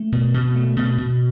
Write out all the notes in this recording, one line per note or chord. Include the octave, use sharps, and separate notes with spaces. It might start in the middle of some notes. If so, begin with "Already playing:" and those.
Already playing: A3
B2
B2
A3
B2
B2